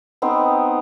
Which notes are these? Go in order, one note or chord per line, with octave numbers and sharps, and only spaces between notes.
B3 C4 D#4 C5